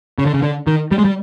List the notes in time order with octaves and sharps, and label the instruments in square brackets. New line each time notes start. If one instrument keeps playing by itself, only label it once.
[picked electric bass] C#3
D3
C#3
D3
D#3
G3
G#3
G3